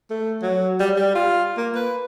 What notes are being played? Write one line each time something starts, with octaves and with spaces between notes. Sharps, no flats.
A3
F#3
G3
G3
F4
A#3
B4